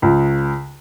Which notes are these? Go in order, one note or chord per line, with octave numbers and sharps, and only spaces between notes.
C#2